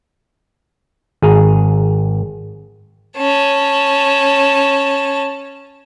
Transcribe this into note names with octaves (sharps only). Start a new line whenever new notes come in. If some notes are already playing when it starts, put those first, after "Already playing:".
G#1 G#4 A#5
C#4 A5